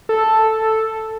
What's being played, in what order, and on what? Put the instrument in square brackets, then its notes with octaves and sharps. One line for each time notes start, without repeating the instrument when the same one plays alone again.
[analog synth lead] A4